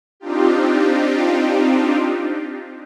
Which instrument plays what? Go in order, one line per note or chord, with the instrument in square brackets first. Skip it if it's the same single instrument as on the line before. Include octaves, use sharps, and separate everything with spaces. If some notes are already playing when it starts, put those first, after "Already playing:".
[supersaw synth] C4 D4 D#4 F4 G4